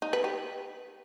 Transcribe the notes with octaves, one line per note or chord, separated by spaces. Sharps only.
D#4
B4
G4